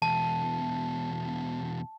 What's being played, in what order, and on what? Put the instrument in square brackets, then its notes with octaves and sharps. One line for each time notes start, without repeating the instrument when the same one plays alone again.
[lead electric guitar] E2 B2 [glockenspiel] A5